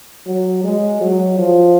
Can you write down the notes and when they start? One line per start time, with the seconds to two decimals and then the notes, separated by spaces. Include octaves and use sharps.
0.27 F#3
0.64 G#3
1.01 F#3
1.39 F3